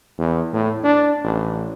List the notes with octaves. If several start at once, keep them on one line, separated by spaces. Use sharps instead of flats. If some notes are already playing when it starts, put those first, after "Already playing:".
E2
A2
D4
A1